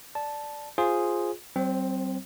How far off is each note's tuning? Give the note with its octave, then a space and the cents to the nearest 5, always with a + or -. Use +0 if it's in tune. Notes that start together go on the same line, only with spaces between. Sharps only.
D5 +0 A5 -5
F4 +0 G#4 +0 C5 +0
G3 -45 C4 +0 C5 +40